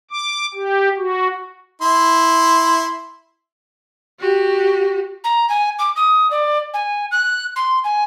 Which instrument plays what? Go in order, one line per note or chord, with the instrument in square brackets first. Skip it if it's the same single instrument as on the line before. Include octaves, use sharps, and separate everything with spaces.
[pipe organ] D6
G4
F#4
[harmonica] E4 C6
[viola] F#4 G4
[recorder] A#5
G#5
D6
D#6
D5
G#5
F#6
C6
G#5